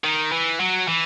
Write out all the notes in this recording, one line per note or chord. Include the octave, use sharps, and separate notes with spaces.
D#3
E3
F#3
E3